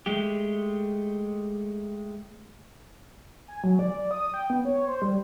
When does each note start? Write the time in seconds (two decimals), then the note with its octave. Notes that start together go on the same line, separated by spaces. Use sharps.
0.06 G#3 A3 G4
3.48 G#5
3.64 F#3
3.79 D5
4.11 D#6
4.34 G5
4.50 B3
4.65 C#5
4.88 C5
5.02 G3